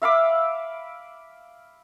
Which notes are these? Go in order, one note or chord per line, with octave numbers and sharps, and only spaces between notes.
E5 F5 B5 D6